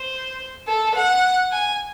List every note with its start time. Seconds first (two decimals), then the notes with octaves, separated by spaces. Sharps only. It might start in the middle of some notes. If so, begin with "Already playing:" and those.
Already playing: C5
0.68 A4
0.95 F#5
1.52 G#5